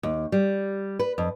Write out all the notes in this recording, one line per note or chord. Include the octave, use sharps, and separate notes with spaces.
D#2
G3
B4
F2